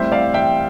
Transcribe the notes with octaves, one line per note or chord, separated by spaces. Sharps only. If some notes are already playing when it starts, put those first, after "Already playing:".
Already playing: A2 G3 C4 C5 E5
D5 F5
E5 G5